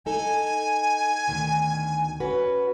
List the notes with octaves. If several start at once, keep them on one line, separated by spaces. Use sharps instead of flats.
D#4 A4 G#5
D2 B2 D#3
C#4 F#4 B4